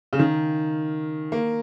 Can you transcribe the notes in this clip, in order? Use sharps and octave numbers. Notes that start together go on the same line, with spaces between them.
C#3
D#3
A#3